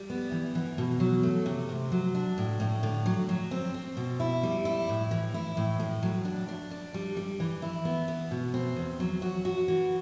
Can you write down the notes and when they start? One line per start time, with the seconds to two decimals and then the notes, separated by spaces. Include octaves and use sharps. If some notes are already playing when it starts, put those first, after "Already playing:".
Already playing: G3
0.10 B3
0.32 E3
0.55 E3
0.78 B2
1.00 F#3
1.23 A3
1.46 C3
1.69 C3
1.92 F#3
2.15 D4
2.38 A2
2.60 A2
2.83 D3
3.06 F#3
3.29 F#3
3.51 C4
3.74 C4
3.97 B2
4.20 E4
4.43 G3
4.65 E4
4.89 A2
5.11 E3
5.34 E4
5.57 A2
5.80 A2
6.03 F#3
6.25 D4
6.48 D4
6.71 D4
6.94 G3
7.17 G3
7.40 E3
7.62 E4
7.85 B3
8.08 B3
8.31 B2
8.54 C4
8.76 E2
9.00 F#3
9.22 F#4
9.45 F#4
9.68 E3